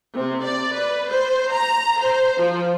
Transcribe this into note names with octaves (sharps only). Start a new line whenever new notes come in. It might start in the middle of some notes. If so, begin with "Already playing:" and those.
C3
D5
B4
C5
A#5
C5
F3